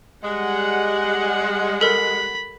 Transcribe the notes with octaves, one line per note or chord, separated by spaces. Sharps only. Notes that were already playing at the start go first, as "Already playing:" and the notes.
G3 G#3 F#5
A4 A#4 B5